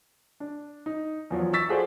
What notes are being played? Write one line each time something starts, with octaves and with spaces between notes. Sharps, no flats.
D4
D#4
E2 F3 F#3
C#6 E6 A6 B6
F4 F#4 G#4 A4 C5 D5